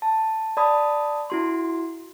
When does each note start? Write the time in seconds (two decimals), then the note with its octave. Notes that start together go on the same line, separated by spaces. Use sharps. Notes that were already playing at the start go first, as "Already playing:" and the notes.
0.02 A5
0.57 D5 A5 B5 D#6
1.30 E4 F#4 C6